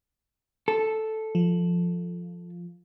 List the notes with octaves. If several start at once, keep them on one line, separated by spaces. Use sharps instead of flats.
A4
F3